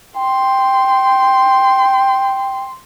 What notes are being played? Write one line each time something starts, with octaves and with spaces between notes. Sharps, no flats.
G5 C6